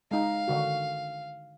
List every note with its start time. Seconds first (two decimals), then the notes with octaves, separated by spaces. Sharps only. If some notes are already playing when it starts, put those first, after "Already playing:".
0.11 G#3 D#4 F5
0.48 D3 D#3 F#4